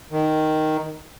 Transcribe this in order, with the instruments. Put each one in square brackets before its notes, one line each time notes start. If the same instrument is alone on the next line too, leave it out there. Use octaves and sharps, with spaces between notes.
[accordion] D#3